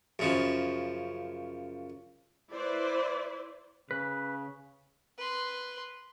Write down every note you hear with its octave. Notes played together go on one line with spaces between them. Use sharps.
F#2 C#3 F3
E4 B4 C5 D5
C#3 B4
B4 C6